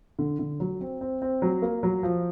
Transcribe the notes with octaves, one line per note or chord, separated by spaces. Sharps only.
D3
D3
F#3
C4
C4
C4
F#3
A#3
F#3
F3